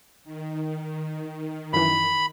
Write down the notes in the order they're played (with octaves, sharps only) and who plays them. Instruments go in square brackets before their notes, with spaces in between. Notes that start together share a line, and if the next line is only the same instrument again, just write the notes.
[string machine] D#3
[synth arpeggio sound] F#2 E3 [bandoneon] B5